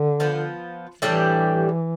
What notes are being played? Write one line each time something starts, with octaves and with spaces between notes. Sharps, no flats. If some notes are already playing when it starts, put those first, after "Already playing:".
Already playing: D3
F3 B3 F4
A2 E3 G3 D4 G4